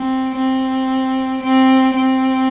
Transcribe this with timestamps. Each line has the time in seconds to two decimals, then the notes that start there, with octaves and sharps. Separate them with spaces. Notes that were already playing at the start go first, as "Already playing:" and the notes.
Already playing: C4
0.37 C4
1.42 C4
1.95 C4